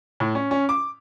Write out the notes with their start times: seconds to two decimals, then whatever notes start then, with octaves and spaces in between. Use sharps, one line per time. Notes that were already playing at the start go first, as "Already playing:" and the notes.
0.20 A2
0.35 C#4
0.51 C#4
0.69 D6